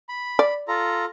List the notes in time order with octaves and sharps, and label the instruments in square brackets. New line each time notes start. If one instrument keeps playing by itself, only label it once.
[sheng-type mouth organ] B5
[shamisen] D5
[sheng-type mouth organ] F4 A4 A#5